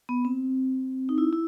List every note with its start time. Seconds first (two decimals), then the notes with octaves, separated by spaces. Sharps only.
0.09 B3
0.25 C4
1.09 D#4
1.18 E4
1.33 E4